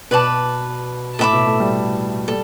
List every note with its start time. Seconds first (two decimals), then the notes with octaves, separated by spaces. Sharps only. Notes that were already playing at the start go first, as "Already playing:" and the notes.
0.11 B2 B4 D5 A5 D6
1.19 A2 A4 E5 B5 D6
1.33 B2
1.47 A3
1.60 G3
2.28 G3 A4